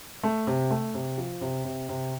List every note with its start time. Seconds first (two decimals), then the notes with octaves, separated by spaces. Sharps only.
0.23 A3
0.47 C3
0.70 A3
0.94 C3
1.18 F3
1.41 C3
1.65 C3
1.89 C3